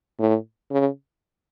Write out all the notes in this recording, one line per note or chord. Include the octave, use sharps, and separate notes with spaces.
A2
C#3